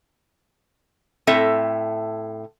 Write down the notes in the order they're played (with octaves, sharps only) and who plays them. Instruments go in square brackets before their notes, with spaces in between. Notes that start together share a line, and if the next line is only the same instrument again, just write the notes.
[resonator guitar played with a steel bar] A2 C4 A4 E5